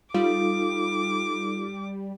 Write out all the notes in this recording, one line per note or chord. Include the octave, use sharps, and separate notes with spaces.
G3 D#4 F4 A4 D6